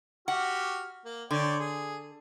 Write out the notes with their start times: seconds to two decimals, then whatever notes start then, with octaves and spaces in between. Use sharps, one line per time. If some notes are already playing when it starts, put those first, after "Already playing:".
0.28 F#4 G4 F#5 F6
1.05 A#3
1.31 D3 C#5 D5 G5
1.60 G#4